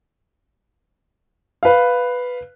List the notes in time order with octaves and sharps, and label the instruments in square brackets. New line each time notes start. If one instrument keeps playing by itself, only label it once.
[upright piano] B4 F5